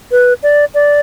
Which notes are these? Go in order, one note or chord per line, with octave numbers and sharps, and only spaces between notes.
B4
D5
D5